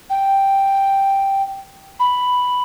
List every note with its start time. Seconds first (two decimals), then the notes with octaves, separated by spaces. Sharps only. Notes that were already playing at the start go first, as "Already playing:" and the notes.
0.10 G5
2.00 B5